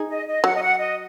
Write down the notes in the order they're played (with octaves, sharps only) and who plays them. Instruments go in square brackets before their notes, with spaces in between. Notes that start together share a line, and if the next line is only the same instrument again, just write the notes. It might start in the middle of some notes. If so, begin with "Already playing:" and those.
Already playing: [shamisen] D#4 G#4
[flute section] D#5
D#5
[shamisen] F#3 [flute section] F#5
[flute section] D#5
F#5
D#5